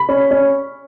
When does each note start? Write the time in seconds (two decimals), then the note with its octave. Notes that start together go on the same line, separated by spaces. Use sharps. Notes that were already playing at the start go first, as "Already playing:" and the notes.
Already playing: B5
0.09 C#4
0.31 C#4